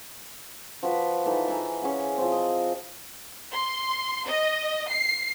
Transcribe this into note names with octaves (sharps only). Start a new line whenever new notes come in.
F3 F#4 B4
E3 D#4 A4
E5 F#5 G#5 A#5
C#4 G#4 F#5
F3 C4
D#5
C6
D#5
C7